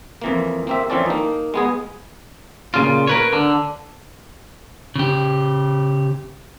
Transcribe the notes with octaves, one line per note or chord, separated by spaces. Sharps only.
F2 E3 A#3
A#3 C4 E5
E3 F3 C4 C#4 A4 D5
A#3 D#4
G#3 B3 G#4
A#2 C#3 F4
A#4 B4 C#5
D3
C#3 G4